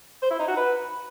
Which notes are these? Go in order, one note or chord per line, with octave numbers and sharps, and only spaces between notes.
C5
E4
D#4
F#4
B4